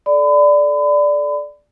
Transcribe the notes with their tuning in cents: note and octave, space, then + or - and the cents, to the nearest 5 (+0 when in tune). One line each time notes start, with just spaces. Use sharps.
A4 -25 D5 +0 B5 +35